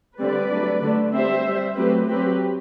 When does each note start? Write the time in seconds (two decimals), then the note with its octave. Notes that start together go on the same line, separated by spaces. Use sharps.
0.19 D3 G3 C4 B4 D5
0.50 F#3 A3 D4
0.81 D3 A3 D4
1.13 G3 C4 C5 E5
1.45 G3 C4
1.76 F#3 A3 C4 G4 B4
2.08 F#3 C4 G4 B4